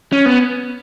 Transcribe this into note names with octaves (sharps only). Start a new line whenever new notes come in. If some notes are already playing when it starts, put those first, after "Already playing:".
C#4
B3